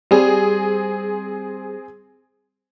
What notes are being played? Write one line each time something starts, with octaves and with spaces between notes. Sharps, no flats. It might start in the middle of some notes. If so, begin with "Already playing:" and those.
G3 C4 G#4